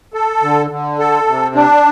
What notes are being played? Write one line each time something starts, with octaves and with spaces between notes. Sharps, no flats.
A4
D3
D3
A4
C3
D4